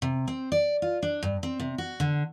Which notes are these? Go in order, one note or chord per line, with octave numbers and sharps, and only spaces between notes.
C3
C4
D5
F4
D4
G2
C4
C3
F#4
D3